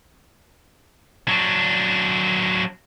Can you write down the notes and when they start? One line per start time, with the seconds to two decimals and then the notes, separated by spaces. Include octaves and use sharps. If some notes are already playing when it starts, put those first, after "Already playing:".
1.28 F#3 D4